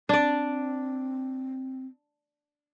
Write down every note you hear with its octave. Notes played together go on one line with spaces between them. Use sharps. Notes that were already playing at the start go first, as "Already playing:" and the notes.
C4 D4 D5